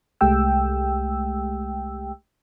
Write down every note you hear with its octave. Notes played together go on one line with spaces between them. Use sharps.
C2 G#3 A3 G4 G5 E6